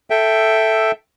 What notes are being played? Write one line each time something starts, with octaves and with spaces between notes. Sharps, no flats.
A4 E5 G5